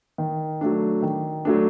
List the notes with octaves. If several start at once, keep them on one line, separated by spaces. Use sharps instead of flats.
D#3
F#3 A3 D4
D#3
F#3 A3 D4